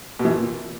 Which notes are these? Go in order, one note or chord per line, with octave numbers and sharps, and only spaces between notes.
B2
E3
A#2